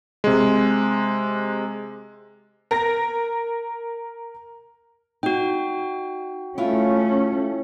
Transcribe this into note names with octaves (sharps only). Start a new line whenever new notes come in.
C3 G#3
A#4 A#6
D#4 F#4 G5
A3 C#4 E4 F4